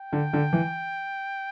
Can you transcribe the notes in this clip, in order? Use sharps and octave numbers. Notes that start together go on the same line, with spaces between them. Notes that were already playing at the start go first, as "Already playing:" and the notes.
Already playing: G5
D3
D3
E3